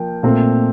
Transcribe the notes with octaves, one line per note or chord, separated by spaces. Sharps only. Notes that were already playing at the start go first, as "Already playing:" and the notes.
Already playing: F3 A#3 G5
A#2 A3 C4